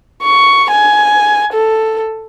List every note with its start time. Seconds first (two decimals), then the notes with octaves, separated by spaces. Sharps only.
0.23 C#6
0.71 G#5
1.53 A4